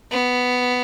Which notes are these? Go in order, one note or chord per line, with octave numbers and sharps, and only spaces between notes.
B3